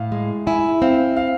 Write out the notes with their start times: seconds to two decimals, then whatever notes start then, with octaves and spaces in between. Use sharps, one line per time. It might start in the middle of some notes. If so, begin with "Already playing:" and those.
Already playing: A2 F5
0.12 G#3
0.47 E4 G#5
0.82 C4 F5
1.16 F5